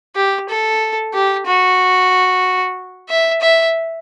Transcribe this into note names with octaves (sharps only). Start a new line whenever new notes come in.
G4
A4
G4
F#4
E5
E5